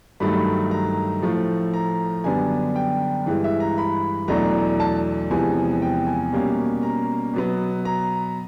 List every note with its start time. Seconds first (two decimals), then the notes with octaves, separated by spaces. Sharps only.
0.20 G2 D#3 F#3 A3 B5
0.71 A#5
1.22 A2 F3 A3
1.74 A#5
2.24 F#2 D3 G3 B3 D4 G#5
2.76 G5
3.26 G2 E3 G#3
3.44 E5
3.60 A#5
3.78 B5
4.28 E2 B2 F#3 A3 D4 A#5
4.80 A5
5.30 E2 C3 F3 G#3 B3 G#5
5.82 G5
6.07 G#5
6.33 B2 G3 A#3 C#4
6.83 A#5
7.34 B2 F#3 B3
7.85 A#5